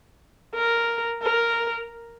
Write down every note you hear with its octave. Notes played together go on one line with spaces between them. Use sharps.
A#4
A#4